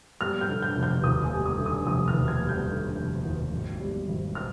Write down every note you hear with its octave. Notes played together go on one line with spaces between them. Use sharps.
G3 F6
G6
D3
G6
F1
G6
D#2 D#6
G#5
G3
D#6
D3
D#6
F1 D#6
F6
D#2
G#6
G3
G6
D3
F1
D#2
G#1
G3
G#1
F6